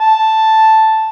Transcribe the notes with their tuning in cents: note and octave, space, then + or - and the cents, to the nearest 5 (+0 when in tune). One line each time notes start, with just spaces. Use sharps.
A5 +0